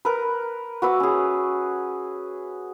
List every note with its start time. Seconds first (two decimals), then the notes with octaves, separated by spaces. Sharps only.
0.05 A#4 B4
0.82 F#4 B4 E5 D6
1.00 C#4 G#4